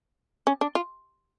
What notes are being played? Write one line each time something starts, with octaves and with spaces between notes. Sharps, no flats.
C#4
D4
F4